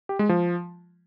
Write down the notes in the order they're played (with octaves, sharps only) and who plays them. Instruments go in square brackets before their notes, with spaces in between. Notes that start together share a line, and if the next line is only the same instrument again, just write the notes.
[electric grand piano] G4
G#3
F3